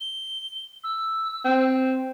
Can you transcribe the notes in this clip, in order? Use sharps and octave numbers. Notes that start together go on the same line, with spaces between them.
G7
E6
C4